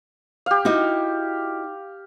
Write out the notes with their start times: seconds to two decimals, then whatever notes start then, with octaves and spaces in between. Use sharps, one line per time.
0.46 G4 F5
0.65 D#4 E4 F#4